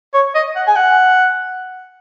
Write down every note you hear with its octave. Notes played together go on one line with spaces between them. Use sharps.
C#5
D#5
F#5
G#5
F#5